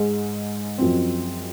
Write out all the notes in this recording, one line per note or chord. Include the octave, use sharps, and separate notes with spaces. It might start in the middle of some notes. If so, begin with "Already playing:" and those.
Already playing: G#2 G#3 G#4
F#2 F3 C4